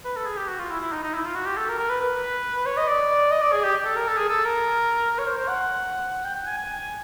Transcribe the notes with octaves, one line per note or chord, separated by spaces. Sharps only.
B4
A4
G#4
G4
F#4
F4
E4
E4
D#4
D#4
E4
F4
F#4
G4
A4
A#4
A#4
B4
B4
C#5
D#5
D5
D#5
D5
G#4
G4
A4
A#4
A4
G#4
A4
A#4
C#5
C5
C5
F#5
G5
G5
G#5
G#5
G#5